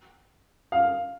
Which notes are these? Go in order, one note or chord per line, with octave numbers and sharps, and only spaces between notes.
F5